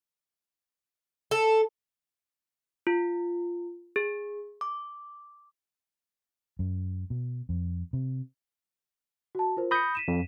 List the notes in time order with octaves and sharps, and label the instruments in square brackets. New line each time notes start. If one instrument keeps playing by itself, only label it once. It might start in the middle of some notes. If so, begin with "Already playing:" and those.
[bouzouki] A4
[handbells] F4
G#4
D6
[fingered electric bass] F#2
B2
F2
C3
[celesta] F#4 A5
F4 A#4 C5
[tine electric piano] B5 D#6 G6 [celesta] A#6 C#7
[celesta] B6 D#7 E7
[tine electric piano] F2